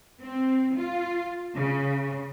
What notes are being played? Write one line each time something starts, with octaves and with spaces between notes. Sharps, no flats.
C4
F4
C#3